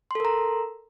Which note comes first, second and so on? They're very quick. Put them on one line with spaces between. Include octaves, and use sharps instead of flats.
C6 A4 A#4 A#5